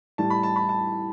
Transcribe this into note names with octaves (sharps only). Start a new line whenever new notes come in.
A2 G3 A5
B5
A5
B5
A5